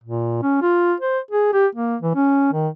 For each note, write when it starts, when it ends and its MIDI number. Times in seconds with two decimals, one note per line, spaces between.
0.04 0.41 46
0.43 0.58 61
0.62 0.94 65
1.00 1.19 72
1.31 1.52 68
1.53 1.67 67
1.75 1.96 58
2.02 2.15 52
2.15 2.51 61
2.53 2.69 51